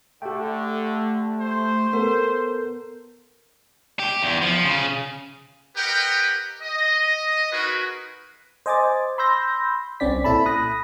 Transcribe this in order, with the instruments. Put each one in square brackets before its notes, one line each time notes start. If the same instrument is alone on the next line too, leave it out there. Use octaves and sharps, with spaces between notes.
[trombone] D3 [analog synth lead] A3 [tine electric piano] G4 G5
[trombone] C5
[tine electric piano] B3 A4 [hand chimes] A#4
[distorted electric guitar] G4
E2
F3
C#3
[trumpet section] G4 A#4 B4 D#5 F#5 G5
D#5
D#4 F#4 G#4 A#4 B4
[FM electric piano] C5 D#5 G#5 D6 A6
B5 C6 E6 G6 A#6
C2 C3 C4 C#4 D5 B6
A#2 E4 A4 A5 B5
B5 D#6 F#6 A#6